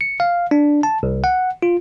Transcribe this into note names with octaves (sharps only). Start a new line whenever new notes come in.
C#7
F5
D4
A5
C2
F#5
F4